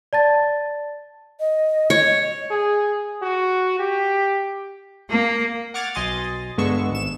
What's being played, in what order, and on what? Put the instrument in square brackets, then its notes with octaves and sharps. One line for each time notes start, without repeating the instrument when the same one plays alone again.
[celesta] D5 A5 A6
[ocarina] D#5
[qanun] C#5
[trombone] G#4
F#4
G4
[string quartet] A#3
[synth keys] F#5 C#6 D6 F6 G#6 A6
B1 D#5 G#5 C6 D#6 A6
G2 D3 G#3 B3 C#6 E6
G#1 E7